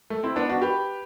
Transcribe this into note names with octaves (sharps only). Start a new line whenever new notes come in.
A3
C4 E4
B3 D4
D4 F#4
G4 B4